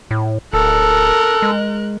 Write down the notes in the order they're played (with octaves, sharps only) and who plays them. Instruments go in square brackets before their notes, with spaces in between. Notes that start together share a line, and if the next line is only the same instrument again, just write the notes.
[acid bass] A2
[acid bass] D1 [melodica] A4 [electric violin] A#4 F#6
[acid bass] G#3